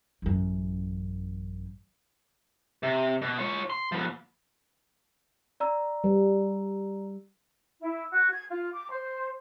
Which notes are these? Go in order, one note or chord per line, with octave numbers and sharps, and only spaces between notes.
A1 F#2
C3
B2
F4 C#5
C6
F3 B3
D5 A#5 E6
G3
E4
F#4
G#6
F4
D6
C5